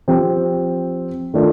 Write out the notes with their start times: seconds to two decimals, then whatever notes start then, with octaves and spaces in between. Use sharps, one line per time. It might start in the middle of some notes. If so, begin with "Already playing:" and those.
0.08 F3 C4 G4
1.34 D#3 A3 D4 F4